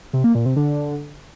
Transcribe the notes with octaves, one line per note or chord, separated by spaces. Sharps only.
C3
A#3
A#2
C3
D3